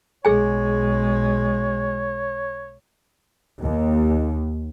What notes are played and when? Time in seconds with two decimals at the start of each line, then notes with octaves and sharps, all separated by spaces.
0.25 B1 G#3 G#4 C#5 G#5
3.61 D#2